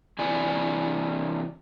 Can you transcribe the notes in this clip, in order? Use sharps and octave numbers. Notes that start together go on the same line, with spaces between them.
C3 E3 D5 G#5